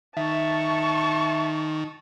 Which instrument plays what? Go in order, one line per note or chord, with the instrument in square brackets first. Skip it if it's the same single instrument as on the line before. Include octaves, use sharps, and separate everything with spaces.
[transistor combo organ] D#3 [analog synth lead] E5 [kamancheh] A5 C#6